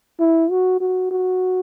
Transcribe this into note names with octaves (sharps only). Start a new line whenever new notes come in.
E4
F#4
F#4
F#4